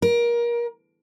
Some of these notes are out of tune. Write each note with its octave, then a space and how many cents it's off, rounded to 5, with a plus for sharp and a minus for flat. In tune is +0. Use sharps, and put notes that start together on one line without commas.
A#4 +25